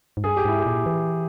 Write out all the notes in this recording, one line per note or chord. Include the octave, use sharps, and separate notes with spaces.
G#2
G2 G#4
G4
G#2 E4
G4
A#2
E3